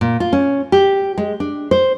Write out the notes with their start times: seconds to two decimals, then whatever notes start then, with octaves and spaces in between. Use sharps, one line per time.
0.01 A#2
0.20 F4
0.33 C#4
0.72 G4
1.18 G#3
1.40 D4
1.71 C5